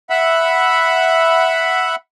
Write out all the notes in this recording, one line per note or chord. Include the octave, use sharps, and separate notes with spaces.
E5 F#5 B5